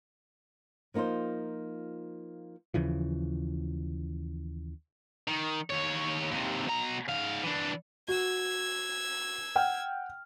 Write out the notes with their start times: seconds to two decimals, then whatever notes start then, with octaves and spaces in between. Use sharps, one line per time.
0.94 F3 A#3 D#4 F4 C5
2.74 D#2 C#3 E3 F3
5.28 D#3
5.70 D#2 C#5
6.31 D#2 C3
6.68 B2 A#5
7.09 G#2 F5
7.44 E3 D4
8.08 F#4 E6 G#6
9.56 F#5 G5 F6